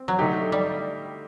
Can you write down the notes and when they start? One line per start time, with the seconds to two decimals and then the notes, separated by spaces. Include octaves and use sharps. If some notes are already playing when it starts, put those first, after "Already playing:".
Already playing: C4
0.08 F#3
0.19 D3 A3 D#4 G4
0.52 G3